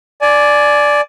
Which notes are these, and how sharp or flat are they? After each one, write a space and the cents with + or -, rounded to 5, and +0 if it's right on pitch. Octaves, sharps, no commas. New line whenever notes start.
D5 +0 G#5 +30